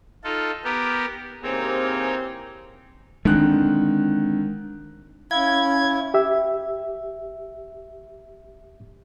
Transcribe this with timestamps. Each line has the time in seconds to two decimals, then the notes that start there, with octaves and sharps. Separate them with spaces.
0.24 D#4 F4 A4
0.64 B3 G4 A#4
1.43 C3 E3 A#3 C4 D#4 G#4 C#5
3.25 D3 D#3 G#3 C4 F#6
5.31 C#4 E4 F5 G#6
6.14 G4 E5